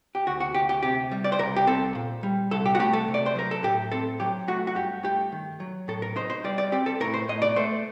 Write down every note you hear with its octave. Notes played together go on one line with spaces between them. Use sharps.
G4
D2 F#4
F#4
D2 G4
G4
C3 G4
G3
D5
C5
C2 A#4
G4
C4 A4
A#2
G3
C2 A4
G4
F#4
A3 G4
A4
C3
D5
C5
F#3 A#4
A4
A2 G4
C4 A4
F#3 G4
A3 F#4
F#4
G2 G4
A3 G4
D#3
F#3
A2 A4
A#4
D#4 C5
C5
G3 D5
D5
C4 G4
A4
A2 A#4
C5
A2 D#5
D5
A3 C5